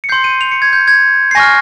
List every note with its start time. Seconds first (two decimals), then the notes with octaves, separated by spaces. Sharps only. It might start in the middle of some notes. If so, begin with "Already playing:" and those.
0.04 C#7
0.09 C6 G6 C7
0.24 D#7
0.41 F7
0.51 C#7
0.62 G#6
0.73 G6
0.88 G#6
1.31 C7
1.35 G#5 C#6 F6 A#6